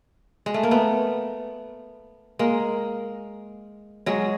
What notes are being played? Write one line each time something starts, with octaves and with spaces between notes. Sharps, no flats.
G#3
A3
A#3
A3 B3
G#3 A#3
F#3 G#3